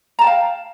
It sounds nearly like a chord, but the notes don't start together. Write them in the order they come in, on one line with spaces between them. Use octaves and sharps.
A#5 A5 G5 F5